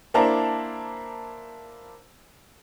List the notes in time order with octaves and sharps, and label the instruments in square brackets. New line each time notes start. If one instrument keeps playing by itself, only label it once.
[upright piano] A#3 D4 E4 C5 A5 A#5